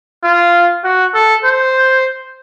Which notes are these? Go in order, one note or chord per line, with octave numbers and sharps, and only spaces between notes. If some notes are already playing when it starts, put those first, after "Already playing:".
F4
F#4
A4
C5